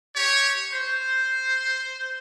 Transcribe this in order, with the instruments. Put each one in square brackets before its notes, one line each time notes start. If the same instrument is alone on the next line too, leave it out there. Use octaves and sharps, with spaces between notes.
[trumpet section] G4 C#5
C5